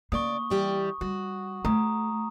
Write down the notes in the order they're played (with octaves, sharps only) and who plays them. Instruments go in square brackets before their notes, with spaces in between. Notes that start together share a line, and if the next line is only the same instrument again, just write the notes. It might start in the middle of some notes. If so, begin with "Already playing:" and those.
[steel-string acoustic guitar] C#3 D5 [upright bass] A#3 [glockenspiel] C#6 D#6
[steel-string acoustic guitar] E3 G3 G4
[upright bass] G3 [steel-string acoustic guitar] F#4
[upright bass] A3 [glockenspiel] A#5 D#6